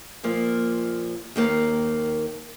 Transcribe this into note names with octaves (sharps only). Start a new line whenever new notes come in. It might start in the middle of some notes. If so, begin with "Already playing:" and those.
A#2 F3 A#3
D#2 D#3 A#3